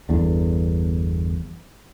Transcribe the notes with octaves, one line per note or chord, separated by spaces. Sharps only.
G1 E2 D3